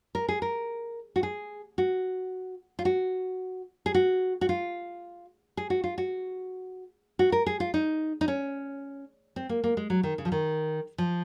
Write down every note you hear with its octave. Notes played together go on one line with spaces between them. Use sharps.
A#4
G#4
A#4
F#4
G#4
F#4
F4
F#4
G#4
F#4
F#4
F4
G#4
F#4
F4
F#4
F#4
A#4
G#4
F4
D#4
D#4
C#4
C4
A#3
A#3
G#3
F#3
D#3
C#3
F3
D#3
F3